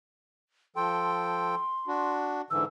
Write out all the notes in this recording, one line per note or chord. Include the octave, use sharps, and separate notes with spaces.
F3 A4 G5 C6
D4 F#4
G#2 D3 E3 E6